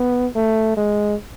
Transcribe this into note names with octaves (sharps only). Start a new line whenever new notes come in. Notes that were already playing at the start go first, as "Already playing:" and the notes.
Already playing: B3
A3
G#3